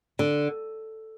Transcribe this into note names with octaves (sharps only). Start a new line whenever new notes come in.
D3